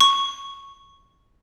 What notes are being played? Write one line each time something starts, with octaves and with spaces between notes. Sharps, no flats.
C#6